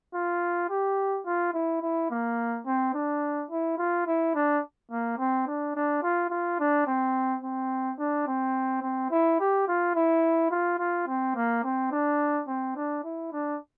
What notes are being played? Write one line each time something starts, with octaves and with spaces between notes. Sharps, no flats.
F4
G4
F4
E4
E4
A#3
C4
D4
E4
F4
E4
D4
A#3
C4
D4
D4
F4
F4
D4
C4
C4
D4
C4
C4
E4
G4
F4
E4
F4
F4
C4
A#3
C4
D4
C4
D4
E4
D4